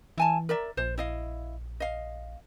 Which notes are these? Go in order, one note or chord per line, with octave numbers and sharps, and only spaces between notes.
E3 E4 G#5 A5
A#4 D5 E5
A#1 C5
E4 D#5 F5
D#5 F5